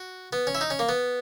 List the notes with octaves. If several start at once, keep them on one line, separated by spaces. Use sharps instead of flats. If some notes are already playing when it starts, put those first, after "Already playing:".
Already playing: F#4
B3
C#4
E4
D#4
C#4
A#3
B3